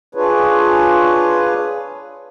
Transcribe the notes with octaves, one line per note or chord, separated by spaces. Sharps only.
D4 F4 G#4 B4 C#5